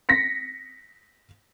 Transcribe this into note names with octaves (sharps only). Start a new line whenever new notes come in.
A#6 B6 C#7